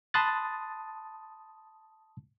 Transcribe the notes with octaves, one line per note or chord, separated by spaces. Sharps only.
A5 B5 C6 D#6 F#6 A6